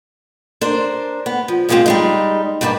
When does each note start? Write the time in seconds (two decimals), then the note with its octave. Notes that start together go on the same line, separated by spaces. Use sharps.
0.61 D4 A#4 C5
1.26 B3
1.48 F3
1.69 A#2 F3 G3 G#3 C4 F4
1.86 G3 G#3 D#4
2.61 G2 G3 A#3 B4 A5